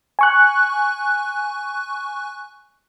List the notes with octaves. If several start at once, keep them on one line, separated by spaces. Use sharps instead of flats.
G#5 C#6 F#6